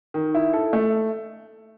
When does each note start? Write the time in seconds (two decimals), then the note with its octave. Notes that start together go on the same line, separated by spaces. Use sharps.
0.14 D#3
0.34 E4
0.53 A4
0.73 A3